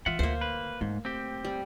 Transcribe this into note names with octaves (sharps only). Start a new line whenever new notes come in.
E3 F4 E5 F#5
D2 A#3 C5
B4
G#2 A3
C4 G4
G3